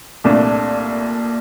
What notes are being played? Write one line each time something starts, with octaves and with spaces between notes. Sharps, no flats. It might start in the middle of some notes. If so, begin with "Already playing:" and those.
C2 A#2 A3 D4